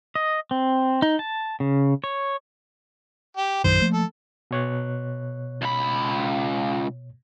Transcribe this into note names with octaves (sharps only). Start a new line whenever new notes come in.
D#5
C4
D#4
A5
C#3
C#5
G4
A#1 F#2 D#3 C5
F3 A3 A#3
A4
B2 C#5 F#6
C#2 B5